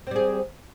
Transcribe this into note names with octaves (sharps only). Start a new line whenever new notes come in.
G3 C4 G#4